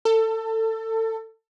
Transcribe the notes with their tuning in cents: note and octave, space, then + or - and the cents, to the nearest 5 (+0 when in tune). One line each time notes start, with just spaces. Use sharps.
A4 +25